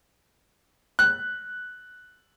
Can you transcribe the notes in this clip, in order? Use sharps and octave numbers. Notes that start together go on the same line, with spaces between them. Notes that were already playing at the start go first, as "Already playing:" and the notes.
F#6